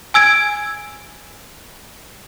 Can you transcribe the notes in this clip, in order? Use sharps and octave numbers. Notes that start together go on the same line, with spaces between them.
G#5 E6 G#6 D7